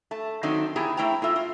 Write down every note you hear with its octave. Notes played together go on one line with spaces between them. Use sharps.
A3 A5
D#3 F#3 A3 C4 D4 D#4
B3 E4 G4 G#4 A#5
A3 E4 C5 G5 A#5
A2 F4 E5
F4